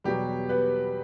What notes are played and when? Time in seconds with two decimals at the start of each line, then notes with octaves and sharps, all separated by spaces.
0.04 E2 B2 F#3 G3 G4
0.49 B3 B4